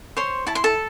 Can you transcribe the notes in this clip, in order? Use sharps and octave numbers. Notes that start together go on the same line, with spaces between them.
C5 C#5 C6
E4 A5
C6
A4 A5